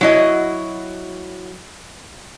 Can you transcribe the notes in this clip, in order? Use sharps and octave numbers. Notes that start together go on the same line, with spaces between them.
F#3 E4 D#5